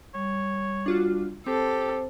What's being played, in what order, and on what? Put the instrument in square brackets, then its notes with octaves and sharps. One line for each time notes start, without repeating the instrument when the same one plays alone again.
[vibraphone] G3 [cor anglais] C#5
[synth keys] D4 F4 F#4
[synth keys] C4 [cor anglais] G4 [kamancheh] A4 [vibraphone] C5